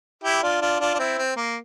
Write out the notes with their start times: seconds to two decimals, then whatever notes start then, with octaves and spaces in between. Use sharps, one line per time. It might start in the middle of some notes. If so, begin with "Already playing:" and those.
0.24 E4 G4
0.43 D4 F4
0.62 D4 F4
0.80 D4 F4
0.95 D4
0.99 C4 E4
1.18 C4
1.37 A#3